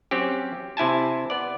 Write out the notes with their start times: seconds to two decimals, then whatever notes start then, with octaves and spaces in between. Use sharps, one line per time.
0.11 F#3 C4 C#4 G4
0.77 C3 E4 G#5 A5
1.30 B3 D5